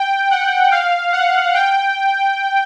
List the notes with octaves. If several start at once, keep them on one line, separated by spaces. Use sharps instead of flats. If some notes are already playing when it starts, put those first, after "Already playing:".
Already playing: G5
F#5
F5
F#5
G5